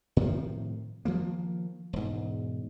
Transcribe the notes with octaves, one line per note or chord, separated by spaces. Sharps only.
A2 C3 D#3 F3
D#3 F3 G#3 A#3
E1 G#2